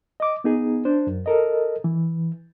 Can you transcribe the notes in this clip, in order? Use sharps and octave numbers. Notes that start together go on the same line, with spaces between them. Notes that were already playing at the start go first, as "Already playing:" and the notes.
D#5 D6
B3 D#4 G#4
D4 C5
F#2
A4 A#4 D#5
E3